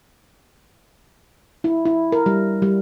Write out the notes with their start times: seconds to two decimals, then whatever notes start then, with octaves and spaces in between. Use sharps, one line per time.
1.64 E4
1.86 E4
2.12 A#4
2.26 G3
2.62 G3